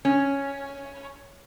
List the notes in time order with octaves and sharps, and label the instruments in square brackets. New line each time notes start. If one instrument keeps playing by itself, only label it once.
[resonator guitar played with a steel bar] C#4